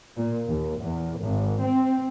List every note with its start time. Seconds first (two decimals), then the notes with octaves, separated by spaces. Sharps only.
0.16 A#2
0.48 D#2
0.81 E2
1.22 G#1
1.62 C4